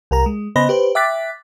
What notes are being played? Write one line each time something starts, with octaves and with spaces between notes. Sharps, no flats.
C2 A#4 A#5
G#3
C#3 B3 C5 D#5 B5 A#6
G4 B4 C5
E5 G5 D6 F#6 A6 B6